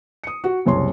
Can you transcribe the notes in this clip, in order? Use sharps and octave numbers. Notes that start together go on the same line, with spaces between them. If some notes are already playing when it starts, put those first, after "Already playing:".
D#6 C#7
F#4
F#1 C2 C#5 C6